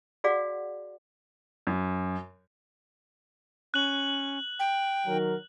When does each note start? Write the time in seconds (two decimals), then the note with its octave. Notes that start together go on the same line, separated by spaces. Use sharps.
0.24 F#4 G#4 D5 F5 F#5
1.67 F#2
3.74 C#4 F#6 F#7
4.59 G5
5.06 D#3 F#3 A#4